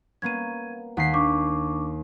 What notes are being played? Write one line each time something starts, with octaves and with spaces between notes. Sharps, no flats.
A#3 B3 C#4 G#6 D#7
D#2 F#5 B6 C7
D4 C#6 D6